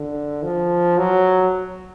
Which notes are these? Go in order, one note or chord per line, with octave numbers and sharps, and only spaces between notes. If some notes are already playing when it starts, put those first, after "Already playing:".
Already playing: D3
F3
F#3